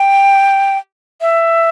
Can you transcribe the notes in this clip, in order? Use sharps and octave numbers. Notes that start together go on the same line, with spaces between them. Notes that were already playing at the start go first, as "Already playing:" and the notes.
Already playing: G5
E5